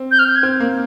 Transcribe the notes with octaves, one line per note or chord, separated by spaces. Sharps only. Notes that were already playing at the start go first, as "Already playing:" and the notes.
Already playing: C4
G6
F6
G6
G#6
C4
A#3